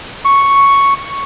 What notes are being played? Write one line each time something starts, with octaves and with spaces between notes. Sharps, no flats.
C#6